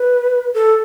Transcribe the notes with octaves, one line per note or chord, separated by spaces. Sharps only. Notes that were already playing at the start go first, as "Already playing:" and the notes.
Already playing: B4
A4